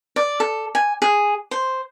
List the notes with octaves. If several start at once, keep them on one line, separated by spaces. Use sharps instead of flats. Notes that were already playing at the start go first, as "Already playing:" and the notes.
D5
A4
G#5
G#4
C5